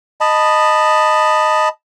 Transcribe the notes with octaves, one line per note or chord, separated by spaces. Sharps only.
D#5 A5 B5